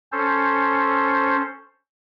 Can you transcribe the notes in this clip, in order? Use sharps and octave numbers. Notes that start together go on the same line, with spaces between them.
C#4 A4 C5